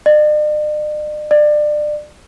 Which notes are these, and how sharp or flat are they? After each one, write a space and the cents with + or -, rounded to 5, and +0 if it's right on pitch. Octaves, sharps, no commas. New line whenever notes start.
D5 +45
D5 +25